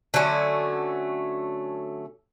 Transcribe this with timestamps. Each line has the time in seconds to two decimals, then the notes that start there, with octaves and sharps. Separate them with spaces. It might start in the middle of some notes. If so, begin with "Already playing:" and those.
0.14 D3 F#3 A3 C#4